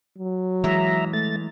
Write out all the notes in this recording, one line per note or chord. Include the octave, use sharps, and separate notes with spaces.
F#3
E3 G#3 E5 A#5
A3 A6